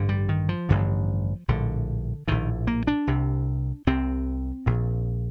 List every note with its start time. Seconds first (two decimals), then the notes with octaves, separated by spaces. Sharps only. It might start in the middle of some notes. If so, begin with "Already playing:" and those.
Already playing: A1 G2 D3
0.09 G3
0.29 D#3
0.49 F3
0.69 A1 G2 D3
1.48 A#1 A2 D3
2.28 A#1 A2 D#3
2.67 A#3
2.87 D4
3.07 C2 C3
3.87 C2 C3 C4
4.66 A#1 A#2